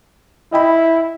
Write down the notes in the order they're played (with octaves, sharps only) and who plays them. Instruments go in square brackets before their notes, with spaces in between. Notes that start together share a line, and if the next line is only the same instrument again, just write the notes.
[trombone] E4 [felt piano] D#5 G5 B5